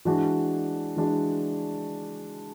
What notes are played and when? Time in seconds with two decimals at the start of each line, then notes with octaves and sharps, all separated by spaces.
0.05 E3 G#3 D4 F#4
0.97 E3 G#3 D4 F#4